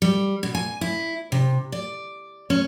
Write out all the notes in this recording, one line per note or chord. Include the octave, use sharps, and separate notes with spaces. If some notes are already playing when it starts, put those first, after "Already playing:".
G3
B2
G#5
E4
C3
D5
C#4